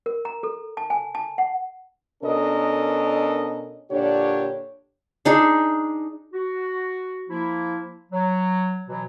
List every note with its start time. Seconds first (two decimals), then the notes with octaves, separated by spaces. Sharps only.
0.06 A#4
0.25 A#5
0.43 A4
0.77 A5
0.90 G#5
1.15 A5
1.38 F#5
2.23 B2 C#4 D4 A4 A#4 D#5
3.90 A#2 D3 D4 G4 C#5
5.25 D4 D#4 G#4
6.33 F#4
7.29 F3 A#3 E4
8.12 F#3
8.88 B2 E3 F#3